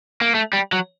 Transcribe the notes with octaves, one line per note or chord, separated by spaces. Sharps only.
A#3
A3
G3
F#3